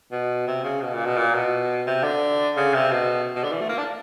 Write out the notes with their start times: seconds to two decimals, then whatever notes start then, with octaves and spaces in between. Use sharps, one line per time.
0.12 B2
0.47 C3
0.64 C#3
0.82 B2
0.94 A#2
1.05 B2
1.17 A#2
1.34 B2
1.87 C3
2.03 D3
2.57 C#3
2.74 C3
2.91 B2
3.35 B2
3.44 D3
3.52 E3
3.61 A3
3.69 A#3
3.78 D4